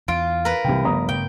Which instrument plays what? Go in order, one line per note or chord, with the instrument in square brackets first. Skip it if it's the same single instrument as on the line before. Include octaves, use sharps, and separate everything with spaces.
[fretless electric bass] E2 [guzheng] F4 [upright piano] D7
[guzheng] A#4 B4
[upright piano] C2 G5 [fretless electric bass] C3 E3 F#3
[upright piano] G1 A#5 D#6 [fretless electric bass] C#3 F3 A3
[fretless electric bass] G2 C#3 A3 [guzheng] G5